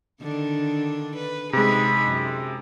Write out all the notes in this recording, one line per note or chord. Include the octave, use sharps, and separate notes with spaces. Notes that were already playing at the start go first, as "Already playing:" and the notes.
D3 D#3 D4
B4
C3 G#3 D#4 G#4 B5
F#2